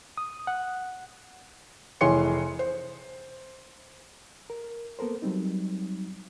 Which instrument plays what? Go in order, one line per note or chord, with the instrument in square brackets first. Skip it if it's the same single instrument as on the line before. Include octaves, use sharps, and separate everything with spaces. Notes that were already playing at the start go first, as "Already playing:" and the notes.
[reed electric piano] D#6
F#5
[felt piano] F1 E3 G#4 C#5 C6 C#7
C5
[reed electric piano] A#4
A#3 B3 A4 A#4 C5
F#3 G3 C4 D#4